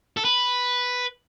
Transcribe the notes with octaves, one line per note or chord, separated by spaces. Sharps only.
A4
B4